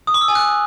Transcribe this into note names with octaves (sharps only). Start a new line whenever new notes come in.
D#6
D6
E6
G#5
F#6